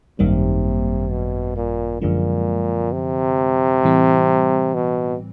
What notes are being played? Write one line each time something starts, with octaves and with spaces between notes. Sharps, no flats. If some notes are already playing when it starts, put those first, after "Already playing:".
G#1 F#2 C3 D#3 G3 A#3
B2
A#2
F#2 A#2 D3 F3 G#3
C3
A2 E3 G3 C4
B2